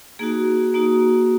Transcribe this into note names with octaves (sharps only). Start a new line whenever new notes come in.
A#3 D#4 F#4 G#4
A#3 D#4 F#4